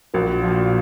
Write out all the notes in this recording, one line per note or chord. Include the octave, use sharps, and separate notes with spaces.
A#1 F#4 A#4
A#2 F3